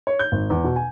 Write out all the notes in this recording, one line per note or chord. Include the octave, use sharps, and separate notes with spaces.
C#5
G6
G#1
E2
B2
G#5